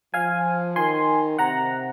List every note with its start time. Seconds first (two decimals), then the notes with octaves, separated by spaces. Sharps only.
0.14 F3 F5 G#5
0.76 D#3 G#5 C6
1.38 C3 F#5 A#5